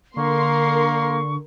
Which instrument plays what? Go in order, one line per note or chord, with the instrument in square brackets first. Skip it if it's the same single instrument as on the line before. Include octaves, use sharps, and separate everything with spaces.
[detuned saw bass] D3 [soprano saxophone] A#3 [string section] A#4 C6 [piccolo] C#6